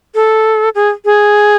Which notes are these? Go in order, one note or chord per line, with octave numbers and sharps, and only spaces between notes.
A4
G#4
G#4